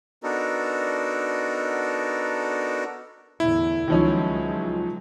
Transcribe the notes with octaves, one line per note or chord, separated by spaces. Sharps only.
B3 D4 D#4 F#4 A4 A#4
E2 A2 D3 E4
C#2 D#3 F3 F#3 G#3 C#4